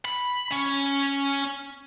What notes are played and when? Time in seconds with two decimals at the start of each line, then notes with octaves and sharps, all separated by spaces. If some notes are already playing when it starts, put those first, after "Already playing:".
0.05 B5
0.53 C#4